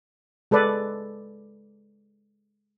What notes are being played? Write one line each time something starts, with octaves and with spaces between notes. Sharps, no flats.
G#3 A4 B4 D5